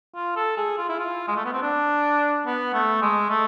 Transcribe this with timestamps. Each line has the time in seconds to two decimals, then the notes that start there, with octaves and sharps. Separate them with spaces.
0.15 F4
0.36 A4
0.57 G#4
0.78 F4
0.89 E4
0.99 F4
1.28 G#3
1.36 A3
1.45 B3
1.53 C4
1.62 D4
2.46 B3
2.73 A3
3.02 G#3
3.30 A3